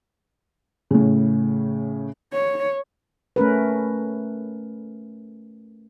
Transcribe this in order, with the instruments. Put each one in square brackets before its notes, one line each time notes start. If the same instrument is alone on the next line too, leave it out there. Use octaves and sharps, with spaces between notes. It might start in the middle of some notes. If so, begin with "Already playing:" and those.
[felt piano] A2 C#3
[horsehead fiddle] C#5
[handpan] A3 C#4 A#4 B4